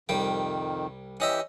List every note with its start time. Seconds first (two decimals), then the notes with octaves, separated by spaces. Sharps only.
0.09 C2 F2 D#3 G3 G5
1.20 E3 C#4 G4 D#5 E5